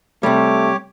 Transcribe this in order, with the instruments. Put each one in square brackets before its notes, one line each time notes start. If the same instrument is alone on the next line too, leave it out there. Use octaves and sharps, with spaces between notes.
[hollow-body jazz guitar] C3 G3 [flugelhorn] A3 [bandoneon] G4 C#5 D6